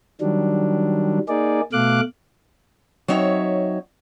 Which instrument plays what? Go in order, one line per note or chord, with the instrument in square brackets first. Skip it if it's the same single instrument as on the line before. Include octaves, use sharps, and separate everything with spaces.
[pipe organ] D#3 F#3 G3 D4
A#3 D#4 G#4 D5
B2 A3 F5 D6 F#6
[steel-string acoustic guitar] F#3 C4 D#4 C#5 E5